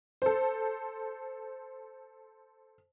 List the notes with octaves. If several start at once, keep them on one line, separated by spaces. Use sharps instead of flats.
A4 C5